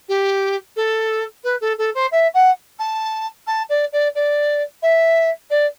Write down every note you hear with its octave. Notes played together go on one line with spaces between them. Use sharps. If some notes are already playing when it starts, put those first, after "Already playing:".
G4
A4
B4
A4
A4
C5
E5
F#5
A5
A5
D5
D5
D5
E5
D5